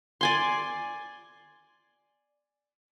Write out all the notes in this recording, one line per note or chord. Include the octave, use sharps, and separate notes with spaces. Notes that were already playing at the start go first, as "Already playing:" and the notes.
D5 G#5 C6